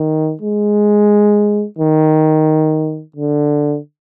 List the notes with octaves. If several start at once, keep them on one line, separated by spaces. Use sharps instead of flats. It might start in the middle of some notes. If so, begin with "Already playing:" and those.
Already playing: D#3
G#3
D#3
D3